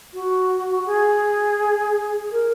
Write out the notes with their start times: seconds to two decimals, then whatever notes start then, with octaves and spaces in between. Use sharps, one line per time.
0.14 F#4
0.86 G#4
2.31 A#4